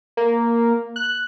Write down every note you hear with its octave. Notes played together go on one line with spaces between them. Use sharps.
A#3
F#6